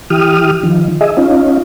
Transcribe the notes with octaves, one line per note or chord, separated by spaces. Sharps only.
E3 G4 D#6 F6
D#3 F3
G#4 D#5 E5
C#4 D#4 F4